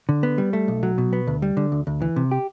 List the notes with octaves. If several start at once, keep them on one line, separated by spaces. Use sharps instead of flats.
D3
B3
G3
A3
B1
F#3
B2
B3
D2
G3
D3
D2
D2
E3
C3
G4